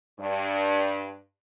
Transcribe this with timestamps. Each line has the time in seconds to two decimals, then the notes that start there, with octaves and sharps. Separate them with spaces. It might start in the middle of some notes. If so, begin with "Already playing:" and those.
0.20 G2